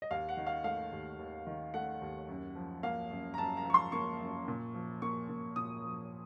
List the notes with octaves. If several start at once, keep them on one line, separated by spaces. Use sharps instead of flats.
D#5
D#2 F5
F#5
D#3
F5
A3 F5
D#2
D#2
D#3
A3 F#5
D#2
F#2
F3
A#3 F5
F#2
A#5
F#2 A5
A#5
F3 C#6
C6
A#3 C#6
F#2
A#2
F3
A#3 C#6
A#2
A#2 D#6
F3